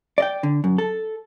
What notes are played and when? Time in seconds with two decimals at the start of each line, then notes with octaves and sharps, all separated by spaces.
0.18 D5 D#5 G5
0.43 D3
0.64 F#2
0.78 A4